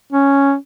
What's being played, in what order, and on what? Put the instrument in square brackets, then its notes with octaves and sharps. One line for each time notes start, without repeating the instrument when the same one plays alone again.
[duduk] C#4